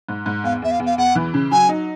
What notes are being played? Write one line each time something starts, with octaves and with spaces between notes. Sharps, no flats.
G#2
G#2
E2 F5
E2 E5
F5
E2
F5
E2 F#5
E3
C#3
F#3 G#5
D#4